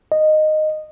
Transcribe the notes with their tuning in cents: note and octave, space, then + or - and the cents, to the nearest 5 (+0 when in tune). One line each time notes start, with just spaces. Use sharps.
D#5 -10